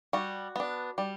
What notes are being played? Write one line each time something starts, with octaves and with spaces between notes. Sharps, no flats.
G3 F#4
B3 D4
G3